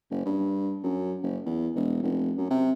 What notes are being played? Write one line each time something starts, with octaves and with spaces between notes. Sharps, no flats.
F#1
G2
F#2
F#1
E2
E1
F1
F#2
C3